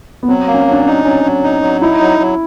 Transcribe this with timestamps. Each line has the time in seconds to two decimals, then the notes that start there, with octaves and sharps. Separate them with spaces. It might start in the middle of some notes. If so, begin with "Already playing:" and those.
0.23 B3
0.28 F#3 C4
0.47 A#3
0.54 C#4
0.67 F#3 D4
0.80 C#4
0.86 D#4
1.05 F#3 C#4
1.24 F#3
1.43 D#4
1.62 F#3
1.81 D#4 E4
2.00 F#3
2.19 F#3